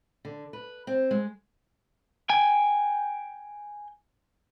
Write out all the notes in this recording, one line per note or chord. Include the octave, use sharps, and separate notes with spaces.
D3
B4
C4
G#3
G5 G#5